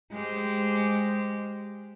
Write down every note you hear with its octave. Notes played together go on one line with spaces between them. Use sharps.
G#3 G4 C5